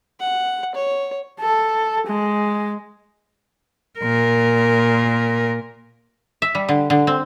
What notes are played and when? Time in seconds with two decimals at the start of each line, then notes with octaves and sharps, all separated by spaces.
0.20 F#5
0.75 C#5
1.41 A4
2.07 G#3
3.99 A#2 A#4
6.42 E5
6.55 G3
6.69 D3
6.90 D3
7.07 C4